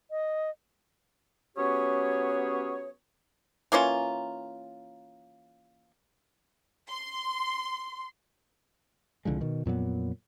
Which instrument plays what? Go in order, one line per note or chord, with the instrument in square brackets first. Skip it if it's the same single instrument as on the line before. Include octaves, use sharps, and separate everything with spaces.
[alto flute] D#5
[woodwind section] F#3 B3 C#4 G4 G#4 C#5
[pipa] E3 A#3 C#4 F4
[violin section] C6
[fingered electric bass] C2 D3 F3 G#3
B2 D#3
F2 A#2 F#3 B3